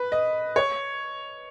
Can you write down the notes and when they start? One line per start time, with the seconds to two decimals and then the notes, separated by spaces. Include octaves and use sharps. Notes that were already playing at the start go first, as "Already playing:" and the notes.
Already playing: B4
0.12 D#5
0.56 C#5